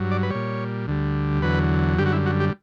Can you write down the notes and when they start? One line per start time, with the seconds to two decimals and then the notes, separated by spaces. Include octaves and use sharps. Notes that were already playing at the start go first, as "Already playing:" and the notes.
Already playing: G2 F#3
0.11 D5
0.23 B4
0.30 A#2 G3 C#5
0.87 D2 D3 G3
1.42 E2 D3 F#3 B4
1.99 F#2 D3 G3 G4
2.06 F#4
2.12 E4
2.26 F#4
2.40 G4